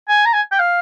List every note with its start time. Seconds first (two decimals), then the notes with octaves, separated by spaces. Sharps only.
0.08 G#5
0.26 A#5
0.33 G#5
0.51 G5
0.59 F5